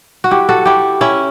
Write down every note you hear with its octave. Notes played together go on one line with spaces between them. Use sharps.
F#4
E4 G4
F#4 A4
E4 G4
C#4 E4